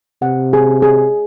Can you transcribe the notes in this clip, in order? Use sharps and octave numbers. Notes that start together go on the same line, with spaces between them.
C3 F#5
G#4
G#4